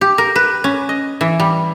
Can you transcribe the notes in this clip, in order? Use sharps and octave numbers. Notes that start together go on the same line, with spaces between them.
G4
A#4
B4
C#4
D#5
E3
G3